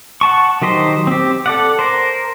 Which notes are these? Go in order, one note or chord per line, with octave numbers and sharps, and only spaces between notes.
F#5 A5 C#6
D#3 F#3 G4 C5 D#5
C4 G4
A4 D5 F#5
A#4 C5